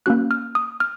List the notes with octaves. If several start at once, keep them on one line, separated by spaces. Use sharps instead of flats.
A#3 C#4 F#4 F#6
F6
D#6
F6